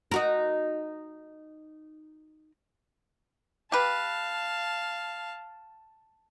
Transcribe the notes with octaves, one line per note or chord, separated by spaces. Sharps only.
D#4 F#4 A#4
G4 B4 F5 A5